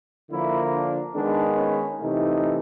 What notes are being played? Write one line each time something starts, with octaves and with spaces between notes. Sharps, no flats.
D3 F3 A#3 E4
D4
D#3 G#3 B3 D4
C#4
C3 E3 A3 D#4